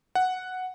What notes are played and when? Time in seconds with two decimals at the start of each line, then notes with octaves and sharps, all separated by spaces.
0.15 F#5